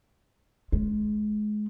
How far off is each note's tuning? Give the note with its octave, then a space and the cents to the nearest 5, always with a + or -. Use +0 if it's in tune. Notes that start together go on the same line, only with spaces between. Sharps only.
G#3 +25